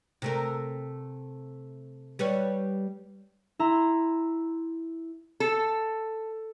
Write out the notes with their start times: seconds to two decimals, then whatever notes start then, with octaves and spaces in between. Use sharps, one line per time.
0.22 C3 A3 A#4
2.19 G3 B4 C#5
3.59 E4 A#5 C6
5.40 A4